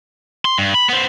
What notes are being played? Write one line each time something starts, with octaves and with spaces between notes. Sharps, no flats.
C6
G2
B5
B3 C5